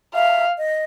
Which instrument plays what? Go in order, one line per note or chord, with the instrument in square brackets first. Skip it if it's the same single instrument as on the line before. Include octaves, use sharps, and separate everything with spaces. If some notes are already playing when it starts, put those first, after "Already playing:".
[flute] E5 [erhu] F5
[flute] D#5